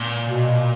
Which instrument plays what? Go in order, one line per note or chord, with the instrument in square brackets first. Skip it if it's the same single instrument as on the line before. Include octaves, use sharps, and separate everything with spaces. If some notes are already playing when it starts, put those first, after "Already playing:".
Already playing: [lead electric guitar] A#2
[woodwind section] B2